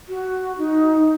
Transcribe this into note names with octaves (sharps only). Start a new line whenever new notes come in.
F#4
D#4